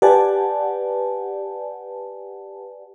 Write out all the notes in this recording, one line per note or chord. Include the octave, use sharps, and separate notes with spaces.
G4 B4 D5 F#5 G#5 A5